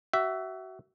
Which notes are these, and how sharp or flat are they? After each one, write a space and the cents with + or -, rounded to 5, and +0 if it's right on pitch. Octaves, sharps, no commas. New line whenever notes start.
F#4 +30 E5 +0